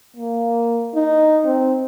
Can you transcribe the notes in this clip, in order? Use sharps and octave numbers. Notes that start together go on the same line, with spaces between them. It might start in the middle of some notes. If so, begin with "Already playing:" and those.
A#3
D#4
C4